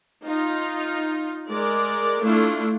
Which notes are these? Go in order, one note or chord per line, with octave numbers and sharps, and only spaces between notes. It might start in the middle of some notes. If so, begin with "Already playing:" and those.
D#4 F4
G#3 A#4 D5
A3 D4 E4 F4